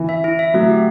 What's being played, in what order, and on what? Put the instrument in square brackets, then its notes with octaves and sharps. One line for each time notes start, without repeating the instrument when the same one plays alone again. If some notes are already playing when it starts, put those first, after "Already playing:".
Already playing: [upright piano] E3
[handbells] E5
E4
E5
[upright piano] F#3 [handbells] A3
[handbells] G4